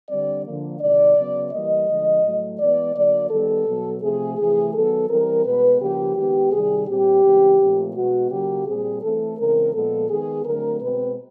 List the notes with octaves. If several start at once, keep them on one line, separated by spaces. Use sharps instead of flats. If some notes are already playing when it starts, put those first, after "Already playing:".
D3 G3 C4 D5
D3 F3 A#3
C3 D#3 G#3 D5
C#3 F#3 B3
E3 G3 A#3 D#5
D3 F3 G#3
A2 F#3 A3
E3 G#3 B3 D5
D3 F#3 A#3 D5
D#3 G3 B3 A4
B2 F#3 B3
C3 F3 A3 C4 G#4
C3 E3 A3 G#4
D#3 F#3 B3 A4
E3 G3 C4 A#4
B2 G#3 B3 B4
C#3 F3 A#3 G4
D#3 G#3 B3 G4
C3 D#3 G3 G#4
A#2 G3 C4 G4
C#3 E3 G#3 C4
A#2 F3 A3 C4
B2 G#3 B3 F#4
C#3 F#3 A#3 G4
A#2 G3 C4 G#4
E3 A3 C4 A4
C#3 E3 G#3 C4 A#4
A#2 F3 G#3 B3 A4
D#3 G#3 B3 G#4
D3 F#3 A3 C4 A#4
B2 G#3 C4 B4